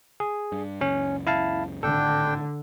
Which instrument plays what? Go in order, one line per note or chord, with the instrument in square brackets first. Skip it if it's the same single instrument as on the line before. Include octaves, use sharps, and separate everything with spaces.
[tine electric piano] G#4
[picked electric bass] G2
[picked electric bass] C#2 F#2 C#3 [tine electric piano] C#4
[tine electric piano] E4 F5 A5
[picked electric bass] G#1 A2 [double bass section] D3 [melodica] D4 G5 [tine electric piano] A4